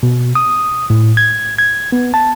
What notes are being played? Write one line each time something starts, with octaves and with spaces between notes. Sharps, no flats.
B2
D#6
A2
G#6
G#6
B3
A5